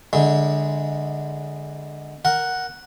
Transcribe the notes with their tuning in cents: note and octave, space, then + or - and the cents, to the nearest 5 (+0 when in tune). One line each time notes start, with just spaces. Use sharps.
D3 +0 G#3 -15 E4 -40
A#4 +0 F#5 +0